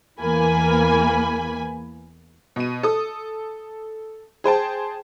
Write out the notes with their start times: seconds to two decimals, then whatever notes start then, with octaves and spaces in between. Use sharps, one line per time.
0.19 E2 E3 A#3 G#5 B5
2.56 B2 D#7
2.83 A4 D#6
4.44 G#4 C5 G5 A5